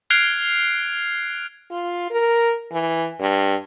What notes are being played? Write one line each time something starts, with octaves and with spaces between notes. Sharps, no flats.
F6 F#6 G#6 C7 D7 F7
F4
A#4
E3
G2